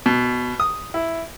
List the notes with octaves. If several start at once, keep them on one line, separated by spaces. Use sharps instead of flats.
B2
D#6
E4